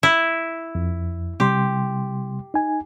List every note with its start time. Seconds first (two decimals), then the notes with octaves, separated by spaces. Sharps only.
0.03 E4
0.75 F2
1.40 C3 G3 G4 C6
2.54 D#4 G#5